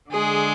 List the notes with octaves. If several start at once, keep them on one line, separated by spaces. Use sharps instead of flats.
D3 G#3 G#4